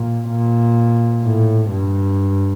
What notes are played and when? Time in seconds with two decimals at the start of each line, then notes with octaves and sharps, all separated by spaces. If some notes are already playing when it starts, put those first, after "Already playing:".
Already playing: A#2
0.29 A#2
1.24 A2
1.70 G2